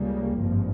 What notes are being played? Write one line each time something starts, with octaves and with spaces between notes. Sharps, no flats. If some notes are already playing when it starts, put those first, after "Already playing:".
Already playing: C#2 C#3 G3 A#3
G#1 G2 F3